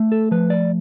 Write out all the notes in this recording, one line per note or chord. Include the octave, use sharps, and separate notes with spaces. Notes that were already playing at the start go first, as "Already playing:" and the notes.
Already playing: A3
A4
F3 B4
D5